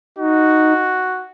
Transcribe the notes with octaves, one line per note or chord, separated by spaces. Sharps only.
D#4 F#4